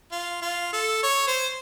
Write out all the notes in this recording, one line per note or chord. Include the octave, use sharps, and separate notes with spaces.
F4
F4
A4
C#5
C5